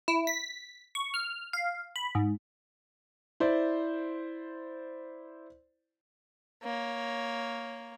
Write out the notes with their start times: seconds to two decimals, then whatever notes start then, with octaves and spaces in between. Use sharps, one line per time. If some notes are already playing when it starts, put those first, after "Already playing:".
0.08 E4
0.27 B6
0.95 C#6
1.14 F6
1.53 F5
1.96 B5
2.15 G#2
3.40 E4 C5 D5
6.63 A#3 C#5